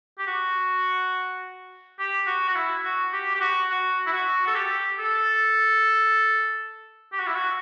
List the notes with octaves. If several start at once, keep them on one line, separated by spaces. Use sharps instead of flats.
G4
F#4
G4
F#4
F#4
E4
F#4
G4
G4
F#4
F#4
E4
F#4
A4
G4
A4
G4
F#4
E4
F#4